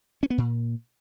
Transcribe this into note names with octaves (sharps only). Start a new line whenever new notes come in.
C#4
B3
A#2